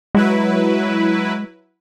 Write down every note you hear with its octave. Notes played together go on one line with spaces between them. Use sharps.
F#3 G#3 E4 B4